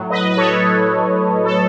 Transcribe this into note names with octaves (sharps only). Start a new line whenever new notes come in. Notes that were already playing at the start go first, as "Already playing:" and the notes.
Already playing: A2 F#3
B4 D#5
B4
A4 C#5
A4